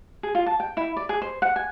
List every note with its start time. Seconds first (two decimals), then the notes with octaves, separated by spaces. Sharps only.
0.23 G#4
0.35 F4
0.46 A5
0.60 G5
0.77 E4
0.97 D5
1.09 G#4
1.22 C5
1.42 F#5
1.56 G#5